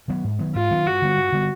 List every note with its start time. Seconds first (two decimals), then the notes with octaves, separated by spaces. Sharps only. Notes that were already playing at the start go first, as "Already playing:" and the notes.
0.08 D#3 F#3 B3
0.24 G#2
0.39 D#3 F#3 B3
0.55 G#2 F4
0.71 D#3 F#3 B3
0.86 G2 F#4
1.02 D3 G3 B3
1.17 G2
1.32 D3 G3 B3